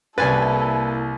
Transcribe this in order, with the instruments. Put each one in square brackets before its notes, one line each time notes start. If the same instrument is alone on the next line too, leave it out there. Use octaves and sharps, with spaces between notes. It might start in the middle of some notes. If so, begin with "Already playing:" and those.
[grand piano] C2 A6 [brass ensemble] A#3 E4 [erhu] A4 [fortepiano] B4 G#5